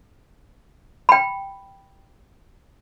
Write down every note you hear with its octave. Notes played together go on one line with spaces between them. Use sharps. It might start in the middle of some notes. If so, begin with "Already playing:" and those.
G5 B5